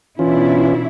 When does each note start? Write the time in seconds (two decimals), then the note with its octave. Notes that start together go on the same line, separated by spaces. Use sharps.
0.19 B2 E3 C#4 D4 E4 F4